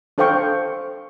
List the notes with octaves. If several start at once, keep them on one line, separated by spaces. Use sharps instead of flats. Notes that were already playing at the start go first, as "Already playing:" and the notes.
D4 A4 C5 F5 G5 C#6